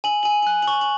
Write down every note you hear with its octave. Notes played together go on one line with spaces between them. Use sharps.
G#5 F#7
G#5 F#7
F#6 F#7
F#7
C#6
F#7